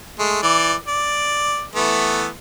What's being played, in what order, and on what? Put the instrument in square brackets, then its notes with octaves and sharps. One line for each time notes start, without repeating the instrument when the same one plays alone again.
[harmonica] G#3 A3
E3 D5
D5
E3 A3 B3